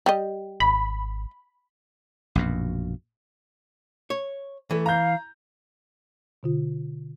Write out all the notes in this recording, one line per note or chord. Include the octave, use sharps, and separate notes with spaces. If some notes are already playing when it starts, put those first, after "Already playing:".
G3 G4 D#5
G#1 B5
A#1 F#2 B2
C#5
E3 A3
F5 A#5 G6
B2 D3 F4